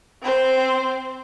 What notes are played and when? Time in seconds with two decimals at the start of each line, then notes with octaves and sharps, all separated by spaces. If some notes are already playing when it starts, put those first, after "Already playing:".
0.23 C4 C5